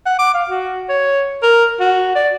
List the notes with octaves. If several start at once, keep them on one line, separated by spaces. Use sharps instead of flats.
F#5
D6
F5
F#4
C#5
A#4
F#4
D5